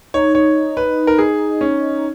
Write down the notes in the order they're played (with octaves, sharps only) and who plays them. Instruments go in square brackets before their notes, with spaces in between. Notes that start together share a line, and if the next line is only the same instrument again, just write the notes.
[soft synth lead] D#4 [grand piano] C#5
[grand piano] C#5
B4
A#4
G#4
C#4